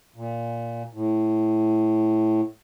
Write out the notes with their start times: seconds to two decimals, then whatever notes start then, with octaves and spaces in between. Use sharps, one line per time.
0.16 A#2
0.94 A2